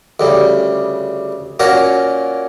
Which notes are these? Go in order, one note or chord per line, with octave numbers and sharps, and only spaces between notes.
D2 C#3 G3
A#2 A#3 C#4 F#4 A#4